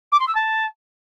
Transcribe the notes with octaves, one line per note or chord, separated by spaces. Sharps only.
D6
C6
E6
A5